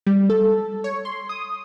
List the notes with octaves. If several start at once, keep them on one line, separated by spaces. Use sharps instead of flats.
G3
A4
C#5
C6
D#6